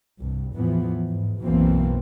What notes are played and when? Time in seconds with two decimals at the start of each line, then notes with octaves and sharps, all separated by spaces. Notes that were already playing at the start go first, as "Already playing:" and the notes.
0.19 C2 G2
0.54 E2 A2 E3 F3 B3
1.08 G#2
1.44 B1 F#2 B2 E3 A#3 C4